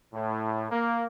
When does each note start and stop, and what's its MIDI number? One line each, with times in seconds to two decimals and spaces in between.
0.13 0.70 45
0.71 1.04 58